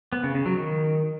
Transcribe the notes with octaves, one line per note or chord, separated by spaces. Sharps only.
B3
C#3
C#3
F#3
D#3